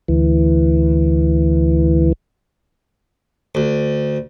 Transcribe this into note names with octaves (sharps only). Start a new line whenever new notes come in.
D2 E3
D2